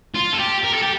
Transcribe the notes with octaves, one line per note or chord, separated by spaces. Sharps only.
F4
A4
G4
A#4
A4
G4